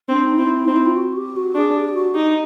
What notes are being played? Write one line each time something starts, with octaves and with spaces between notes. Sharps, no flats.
C4 D4
D#4
C4 E4
C4 D#4
E4
F4
F#4
G4
F#4
D4 G#4
G4
F#4
D#4 G4